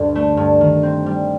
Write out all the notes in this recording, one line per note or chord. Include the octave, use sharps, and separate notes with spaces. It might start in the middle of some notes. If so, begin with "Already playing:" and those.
Already playing: D2 G2 D3
A3
G2
D#3
C4
G3